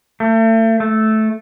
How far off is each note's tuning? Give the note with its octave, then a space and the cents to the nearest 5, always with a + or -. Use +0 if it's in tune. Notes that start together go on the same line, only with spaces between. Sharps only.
A3 +35
A3 -10